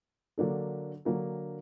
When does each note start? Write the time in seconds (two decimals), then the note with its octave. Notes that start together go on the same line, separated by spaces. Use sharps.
0.38 D3 F#3 A#3 D4 A4
1.05 D3 F#3 A#3 D4 A4